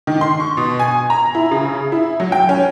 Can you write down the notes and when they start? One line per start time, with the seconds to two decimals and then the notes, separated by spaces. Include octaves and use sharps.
0.07 D#3
0.21 C6
0.40 C#6
0.57 B2
0.79 G#5
1.10 A#5
1.35 E4
1.51 C#3
1.92 E4
2.20 F#3
2.32 G5
2.49 C#4